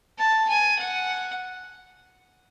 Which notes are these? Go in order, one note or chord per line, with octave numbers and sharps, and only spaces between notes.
A5
G#5
F#5